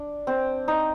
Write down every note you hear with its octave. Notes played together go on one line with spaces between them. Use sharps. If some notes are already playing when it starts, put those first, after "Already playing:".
Already playing: D4
C4
D#4